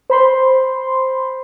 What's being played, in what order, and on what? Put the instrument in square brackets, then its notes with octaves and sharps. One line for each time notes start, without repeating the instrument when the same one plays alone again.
[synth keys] C5 B5 C6